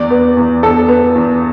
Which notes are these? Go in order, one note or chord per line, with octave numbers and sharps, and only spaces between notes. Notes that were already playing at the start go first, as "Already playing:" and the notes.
Already playing: E2 D5
B3
E2
E2 A4
B3
E2